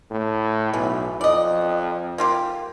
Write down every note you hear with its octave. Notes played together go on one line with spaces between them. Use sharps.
A2
B1 E3
F2 D5 D#5
A#3 F4 G4